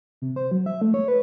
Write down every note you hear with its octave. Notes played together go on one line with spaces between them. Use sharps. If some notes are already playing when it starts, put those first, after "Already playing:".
C3
C5
F#3
E5
A3
C#5
B4